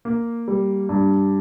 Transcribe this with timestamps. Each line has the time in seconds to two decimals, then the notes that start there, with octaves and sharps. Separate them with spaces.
0.05 A#3
0.48 G3
0.89 G2